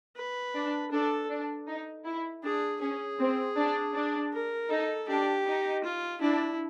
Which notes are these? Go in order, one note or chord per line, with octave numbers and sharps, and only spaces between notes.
B4
D4
D4 A4
D4
D#4
E4
D4 G#4
C#4 G#4
C4
D4
D4
A#4
D#4 A4
D4 G4
D#4
F4
D4 E4